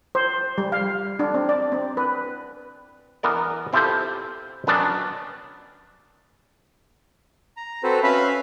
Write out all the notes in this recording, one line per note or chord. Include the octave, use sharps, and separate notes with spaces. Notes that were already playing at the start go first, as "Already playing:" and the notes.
C5
G3
F5
D4
C4
D5
C4
B4
E3 B3 A#4 D5
C4 E4 F4 G4 A4 C5
D#3 F#3 B3 C#4 D4
A#5
C4 F#4 A4 B4 C5
C#4 B4 E5 F5 B5